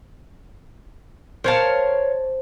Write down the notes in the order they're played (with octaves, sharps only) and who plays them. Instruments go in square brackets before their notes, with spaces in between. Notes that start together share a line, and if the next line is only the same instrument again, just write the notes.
[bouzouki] A#4 C#5 F5 [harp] C5 A5